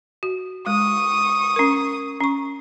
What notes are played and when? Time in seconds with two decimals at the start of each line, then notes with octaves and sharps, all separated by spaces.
0.23 F#4
0.67 G#3 C#6 D#6
1.56 C#4 A#4
2.20 C#4 C#6